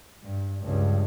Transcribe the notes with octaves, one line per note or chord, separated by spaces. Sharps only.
G2
C#2 G2